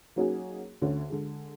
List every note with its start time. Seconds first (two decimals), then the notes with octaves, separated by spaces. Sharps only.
0.16 F#3 A#3 C#4 D#4 F#4 G#4
0.82 D2 D3 C#4
1.09 D3 G#3